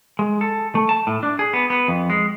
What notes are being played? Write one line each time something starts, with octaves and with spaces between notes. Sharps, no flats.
G#3
A4
A3
A5
A2
D4
G#4
B3
B3
F2
G#3